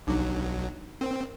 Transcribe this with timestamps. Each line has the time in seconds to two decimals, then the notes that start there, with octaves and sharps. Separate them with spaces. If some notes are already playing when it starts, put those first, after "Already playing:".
0.07 B1 F#3 D4 D#4 D6
1.01 C4 A#4